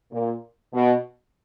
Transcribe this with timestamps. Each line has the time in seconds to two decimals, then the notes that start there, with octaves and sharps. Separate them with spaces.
0.12 A#2
0.73 B2